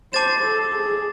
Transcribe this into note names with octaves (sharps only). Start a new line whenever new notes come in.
C5 A5 D6 A6 E7
A4
G#4